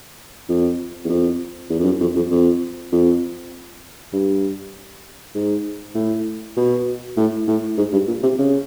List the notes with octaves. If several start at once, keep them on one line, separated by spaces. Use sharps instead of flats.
F2
E2
F2
E2
F2
F#2
F2
F2
F2
F2
G2
G#2
A2
B2
A2
A2
G#2
G2
A#2
C3
C#3